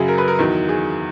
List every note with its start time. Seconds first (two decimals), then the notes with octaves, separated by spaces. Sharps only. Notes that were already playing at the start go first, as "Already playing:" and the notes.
Already playing: F#2 C#3 F#3 G#4
0.08 A#4
0.18 B4
0.28 A#4
0.39 E2 D#3 F#3
0.69 G#4